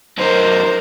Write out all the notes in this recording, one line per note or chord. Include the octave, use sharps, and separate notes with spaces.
F#2 D#4 A#4 C5